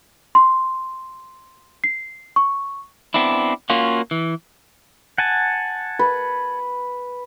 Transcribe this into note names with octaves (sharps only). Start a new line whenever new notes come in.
C6
C7
C#6
B3 C4 D4 E4
A#3 C#4 F4 F#4
E3
F#5 G#5 A5
B4